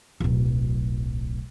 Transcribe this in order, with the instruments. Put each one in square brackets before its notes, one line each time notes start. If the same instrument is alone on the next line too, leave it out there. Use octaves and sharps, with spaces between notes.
[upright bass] D1 B1